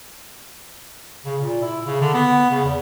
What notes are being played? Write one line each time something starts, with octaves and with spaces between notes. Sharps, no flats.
C#3
A#2
E4
C#3
D3
B3
C#3
E2